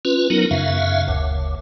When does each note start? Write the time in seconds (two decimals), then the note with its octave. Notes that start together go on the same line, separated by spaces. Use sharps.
0.05 C#4 F4 B4
0.30 F#3 B3 D#4 A#4
0.51 F#2 C#3 E5 F5
1.08 F#1 D2